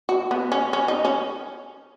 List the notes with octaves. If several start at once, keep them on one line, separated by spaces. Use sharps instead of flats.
F#4
B3
C#4
C#4
D#4
C#4